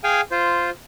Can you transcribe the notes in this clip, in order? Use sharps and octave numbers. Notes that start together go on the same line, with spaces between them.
G#4 F5 G5 G#5
F4 C5